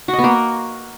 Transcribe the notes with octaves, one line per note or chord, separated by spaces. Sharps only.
F#4
D#5
B3
A#3